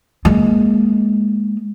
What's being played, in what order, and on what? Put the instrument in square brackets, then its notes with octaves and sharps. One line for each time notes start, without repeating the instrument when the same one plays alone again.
[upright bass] G#3 A#3